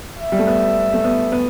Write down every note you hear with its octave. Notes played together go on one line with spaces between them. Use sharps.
E5
G3
A3
B3
A3
B3
B3